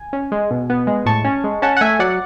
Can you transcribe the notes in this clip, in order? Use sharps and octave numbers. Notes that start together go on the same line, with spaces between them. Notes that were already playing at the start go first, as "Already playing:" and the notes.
Already playing: G#5
C#4
G#3
B2
B3
G#3
A2 A5 C#6
C#4
G#3
C#4 F#5 A5
F#5
A3 E5 G#5
F#3 D5 F#5